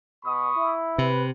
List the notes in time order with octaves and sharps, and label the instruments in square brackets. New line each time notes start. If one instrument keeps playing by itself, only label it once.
[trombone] B2 [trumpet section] B5 C#6 D#6
[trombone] E4
[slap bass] C3 [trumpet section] B4